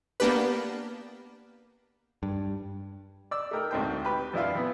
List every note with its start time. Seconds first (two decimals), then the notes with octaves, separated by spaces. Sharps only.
0.20 A#3 B3 D4 G4 B4
2.23 G2
3.31 D5 E6
3.51 A3 D#4 A#4 G5
3.71 D2 G#2 C4 C5 G5
4.04 G4 B4
4.33 F2 E3 D4 E4 F4 F5
4.55 E3 B3